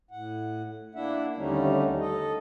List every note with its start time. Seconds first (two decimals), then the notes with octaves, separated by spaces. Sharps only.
0.11 A2 F#5
0.95 A#3 D4 E4 E5 F#5
1.37 D#2 D3 G3 A3 C#4 D#4
2.00 A4 D#5